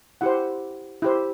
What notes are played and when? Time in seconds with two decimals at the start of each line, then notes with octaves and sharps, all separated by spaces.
0.21 E4 G4 C5 F#5
1.02 E4 G4 C5